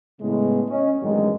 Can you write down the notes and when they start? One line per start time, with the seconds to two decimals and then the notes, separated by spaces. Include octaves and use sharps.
0.21 A2 C#3 G#3 B3
0.68 C#4 D#5
1.02 A1 E2 G2 D#3 F#3 G#3